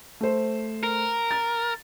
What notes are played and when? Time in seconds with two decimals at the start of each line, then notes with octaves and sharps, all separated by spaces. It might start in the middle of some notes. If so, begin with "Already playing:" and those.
0.21 A3 C5
0.83 A#4
1.31 A6